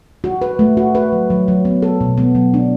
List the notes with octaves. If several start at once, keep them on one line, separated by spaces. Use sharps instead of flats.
F#4
B4
A3
F#4
B4
F#3
F#3
F#3
B3
A4
B2
B3
F#3
D4